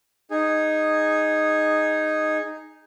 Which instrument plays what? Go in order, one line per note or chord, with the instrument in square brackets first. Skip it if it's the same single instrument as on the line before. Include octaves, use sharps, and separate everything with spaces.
[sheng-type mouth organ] D#4 G#4